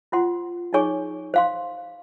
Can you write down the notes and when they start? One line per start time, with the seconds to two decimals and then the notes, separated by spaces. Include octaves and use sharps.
0.12 F4 C5 F#5 C6
0.73 D#4 G#4 C#5 G#5 C#6
1.34 C5 F5 C6